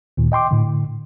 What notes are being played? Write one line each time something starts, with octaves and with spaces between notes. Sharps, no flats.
D2 A#2 D#3
D#5 G5 C6 D6
A2 D3